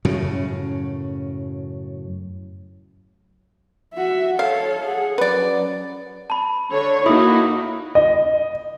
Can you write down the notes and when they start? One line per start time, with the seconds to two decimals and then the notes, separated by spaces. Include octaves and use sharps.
0.05 F#2 A2 C#3
3.94 F#4 E5
4.39 A4 C#5 F5
4.85 G#4 F#5
5.18 F#3 C#4 B4 D5
6.30 A5 B5
6.70 D3 C#5
7.06 A#3 D#4 E4 F#4 B5 D#6
7.95 D#5